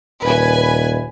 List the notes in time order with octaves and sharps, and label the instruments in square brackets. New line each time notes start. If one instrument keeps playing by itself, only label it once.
[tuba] D#1 [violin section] B4 G#5